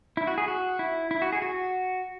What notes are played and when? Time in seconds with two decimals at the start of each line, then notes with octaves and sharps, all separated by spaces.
0.17 E4
0.27 F#4
0.38 G#4
0.48 F#4
0.79 E4
1.11 E4
1.22 F#4
1.32 G#4
1.42 F#4